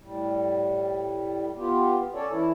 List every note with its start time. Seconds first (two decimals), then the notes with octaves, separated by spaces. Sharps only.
0.02 A2 G3
1.57 B3 F4 G4
2.15 C#4 A4 C#5 D5
2.31 E3 E4